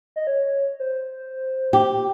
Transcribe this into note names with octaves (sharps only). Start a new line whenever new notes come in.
D#5
C#5
C5
G4